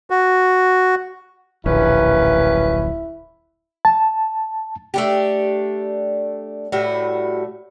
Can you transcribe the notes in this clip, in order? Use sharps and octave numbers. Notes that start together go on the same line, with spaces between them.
F#4
D1 A#1 D#2 C#4 E4 B4
A5
A3 D4 G4
A2 G3 F#4